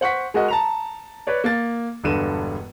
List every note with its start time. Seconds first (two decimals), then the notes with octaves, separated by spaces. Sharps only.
0.01 C5 F#5 C#6 B6
0.34 G#3 F#4 A#4 D#5
0.48 A5 A#5 F7
1.27 B4 C#5 D5
1.44 A#3 A6
2.03 E1 G2 D3 D#7 E7